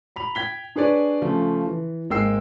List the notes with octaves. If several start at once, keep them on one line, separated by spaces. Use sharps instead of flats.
A#5 B5 F7
G5 G#6 B6 G7
D4 G#4 B4 C#5 D5
C#3 F3 A3
E3
G#1 G#3 A#3 G5 E6 C7